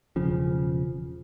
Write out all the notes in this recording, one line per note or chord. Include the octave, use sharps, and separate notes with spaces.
E1 C#3 F3